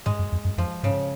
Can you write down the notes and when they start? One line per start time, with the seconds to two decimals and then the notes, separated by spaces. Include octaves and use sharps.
0.06 G#2 G#3
0.19 F#2
0.32 F2
0.45 F#2
0.58 F2 F3
0.83 G#2 C#3